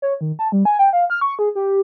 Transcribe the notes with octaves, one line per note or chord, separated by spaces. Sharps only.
C#5
D#3
A5
G3
G#5
G5
F5
F6
C#6
G#4
G4